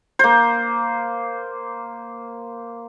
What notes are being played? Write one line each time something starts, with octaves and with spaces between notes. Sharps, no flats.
A#3 C5